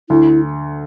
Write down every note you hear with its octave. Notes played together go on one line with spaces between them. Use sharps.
D2 E4